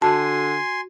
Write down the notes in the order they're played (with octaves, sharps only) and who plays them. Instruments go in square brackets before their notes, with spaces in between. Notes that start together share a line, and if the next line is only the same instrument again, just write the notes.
[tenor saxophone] D3 [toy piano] F#4 [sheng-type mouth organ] G#5 C6 [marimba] A5